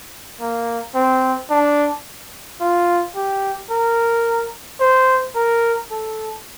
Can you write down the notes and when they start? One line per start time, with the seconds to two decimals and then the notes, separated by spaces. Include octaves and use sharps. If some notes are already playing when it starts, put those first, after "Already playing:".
0.40 A#3
0.95 C4
1.50 D4
2.61 F4
3.15 G4
3.70 A#4
4.80 C5
5.36 A#4
5.91 A4